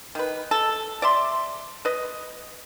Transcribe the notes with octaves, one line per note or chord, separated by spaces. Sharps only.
D#3 B4
A4
D5 E5 C6
B4 D#5